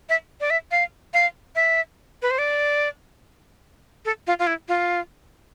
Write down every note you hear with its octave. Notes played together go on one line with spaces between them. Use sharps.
E5
D5
E5
F5
F5
E5
B4
C5
D5
A4
F4
F4
E4
F4